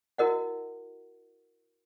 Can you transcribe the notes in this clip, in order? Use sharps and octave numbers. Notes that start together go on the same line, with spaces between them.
E4 F#4 A#4 D#5 F#5